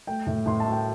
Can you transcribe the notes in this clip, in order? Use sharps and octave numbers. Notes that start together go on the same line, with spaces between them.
A3 G5
A2
A2 C6
A3 A5
G5